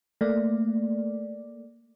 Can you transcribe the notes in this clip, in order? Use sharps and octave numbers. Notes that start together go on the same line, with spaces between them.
A3 A#3 D5